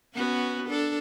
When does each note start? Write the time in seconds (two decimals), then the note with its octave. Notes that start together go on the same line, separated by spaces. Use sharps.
0.15 B3 C#4 F#4
0.66 D4 A4